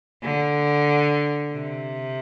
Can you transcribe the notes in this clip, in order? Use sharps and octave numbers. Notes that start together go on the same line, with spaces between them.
D3
C3